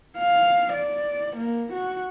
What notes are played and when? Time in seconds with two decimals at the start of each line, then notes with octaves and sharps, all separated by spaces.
0.17 F5
0.73 D5
1.36 A#3
1.73 F#4